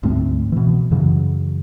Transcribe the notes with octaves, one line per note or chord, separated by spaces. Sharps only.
D2 G#2 A3 C4
B2 E3
F#2 C#3 E3 F#3